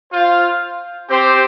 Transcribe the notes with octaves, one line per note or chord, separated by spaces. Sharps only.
F4 C5 F5
C4 G4 C5